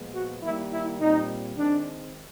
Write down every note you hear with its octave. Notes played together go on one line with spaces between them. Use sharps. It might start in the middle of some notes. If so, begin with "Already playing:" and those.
Already playing: A#2 F3 G#3 B3
F#4
D#3 G3 A#3 E4
E4
A#2 G3 C4 D#4
D#3 G#3 C4 D4